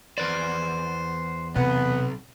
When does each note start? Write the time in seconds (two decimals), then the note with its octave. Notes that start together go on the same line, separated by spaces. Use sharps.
0.18 E2 B4 C5 D5
1.56 B1 C3 B3